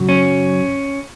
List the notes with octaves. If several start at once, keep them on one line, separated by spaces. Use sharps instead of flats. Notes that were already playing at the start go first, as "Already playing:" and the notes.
Already playing: F#2 C#3 F#3
C#4